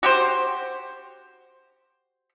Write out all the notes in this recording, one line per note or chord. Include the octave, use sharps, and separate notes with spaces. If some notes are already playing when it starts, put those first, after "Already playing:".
F#4 G4 C5